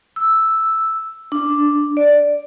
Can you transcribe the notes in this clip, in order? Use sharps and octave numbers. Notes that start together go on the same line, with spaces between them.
E6
D4
D5